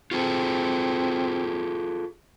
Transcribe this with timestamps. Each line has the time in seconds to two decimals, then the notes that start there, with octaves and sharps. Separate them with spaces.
0.11 C4 F4 G#4 A4